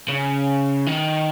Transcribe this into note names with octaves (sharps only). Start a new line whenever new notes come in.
C#3
D#3